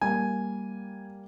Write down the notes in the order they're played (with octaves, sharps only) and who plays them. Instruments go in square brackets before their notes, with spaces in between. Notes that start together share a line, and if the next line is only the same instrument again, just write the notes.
[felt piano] G3 A#3 [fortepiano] G#5